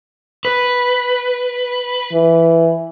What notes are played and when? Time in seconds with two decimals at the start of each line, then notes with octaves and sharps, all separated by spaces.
0.45 B4
2.13 E3